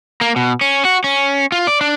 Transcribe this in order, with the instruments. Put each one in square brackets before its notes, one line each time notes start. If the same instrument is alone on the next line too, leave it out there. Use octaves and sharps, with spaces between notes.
[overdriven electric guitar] A#3
B2
C#4
F#4
C#4
F4
D5
D4